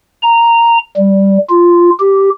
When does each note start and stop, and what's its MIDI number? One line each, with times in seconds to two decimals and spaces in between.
0.22 0.77 82
0.97 1.38 55
1.49 1.90 65
2.00 2.29 67